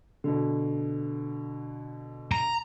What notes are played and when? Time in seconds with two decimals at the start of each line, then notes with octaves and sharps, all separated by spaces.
0.24 B2 D3
2.32 A#5